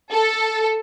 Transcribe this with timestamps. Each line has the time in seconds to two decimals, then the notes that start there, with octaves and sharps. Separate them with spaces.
0.11 A4